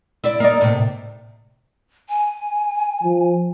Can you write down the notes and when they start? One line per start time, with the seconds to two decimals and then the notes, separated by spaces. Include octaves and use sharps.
0.24 E4 D5
0.40 A#3 D#4 D5
0.61 A2 C3
2.09 G#5
3.03 F3